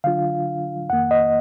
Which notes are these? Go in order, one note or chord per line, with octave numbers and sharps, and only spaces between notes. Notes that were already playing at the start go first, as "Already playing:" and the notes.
D3 F#3 D4 F4 F5
F2 D#3 A#3 F#5
D#5